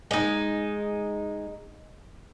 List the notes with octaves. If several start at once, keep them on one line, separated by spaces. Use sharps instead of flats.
G#3 D#4